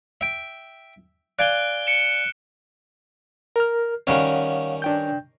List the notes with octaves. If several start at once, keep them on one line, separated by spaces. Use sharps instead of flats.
E5 G5
D5 F5 G#5 F#6 D7 G7
C#7 D7 E7
A#4 F6
D#3 G3 C#4 C#5 F5 F#5
D4 G5 G6